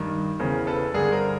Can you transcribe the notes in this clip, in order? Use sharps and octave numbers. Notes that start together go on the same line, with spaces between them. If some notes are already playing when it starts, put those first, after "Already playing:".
Already playing: G2 D#3
E2 C#3 E3 A#4 C5
A4 B4
G2 D3 G#4 A#4
A#4 C5